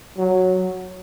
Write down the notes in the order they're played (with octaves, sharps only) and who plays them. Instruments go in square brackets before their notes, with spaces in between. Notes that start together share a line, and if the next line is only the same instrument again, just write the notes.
[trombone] F#3